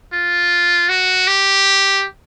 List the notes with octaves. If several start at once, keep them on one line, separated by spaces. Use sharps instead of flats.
F4
F#4
G4